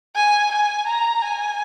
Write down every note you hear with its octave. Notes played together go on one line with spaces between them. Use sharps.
G#5
G#5
A#5
G#5